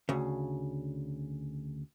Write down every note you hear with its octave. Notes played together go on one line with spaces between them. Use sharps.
D2 C#3